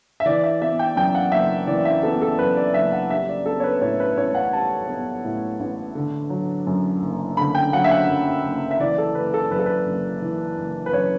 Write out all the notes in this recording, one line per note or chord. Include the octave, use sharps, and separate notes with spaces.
E5
E3 D5
E5
B3 E5
G5
F#2 G5
F#5
F#1 E5
E3 D5
E5
B3 A4
A4
F#2 B4
D5
F#1 E5
F#5
G3 E5
D5
B3 A4
C#5
B4
A2 C#5
B4
A1 C#5
F#5
G3 A5
B3
A2
A1
D3
F#3
F#2
F#1
D3 B5
G5
F#3 F#5
E5
F#5
F#2
F#1
E5
E3 D5
A4
F#1 B4
A4
F#2 B4
A4
B4
F#1
E3
F#1
B4
F#2 C#5